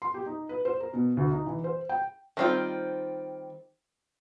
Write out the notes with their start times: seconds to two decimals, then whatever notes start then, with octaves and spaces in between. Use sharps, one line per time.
0.02 C6
0.14 G4
0.26 D#4
0.49 B4
0.65 C5
0.81 A#4
0.93 B2
1.17 D2
1.32 D#4
1.46 E3
1.64 C5
1.89 G5
2.37 D#3 G3 C4 D4 F4